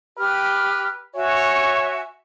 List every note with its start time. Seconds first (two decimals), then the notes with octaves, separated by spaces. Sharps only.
0.17 G4 B4 F6
1.15 F#4 C#5 E5 G#5